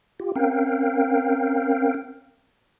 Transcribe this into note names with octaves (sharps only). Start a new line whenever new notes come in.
F4 G4
C4 C#4 A#4 F5 G5